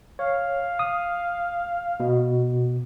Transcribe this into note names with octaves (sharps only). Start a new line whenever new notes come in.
C#5 F5
D#6
B2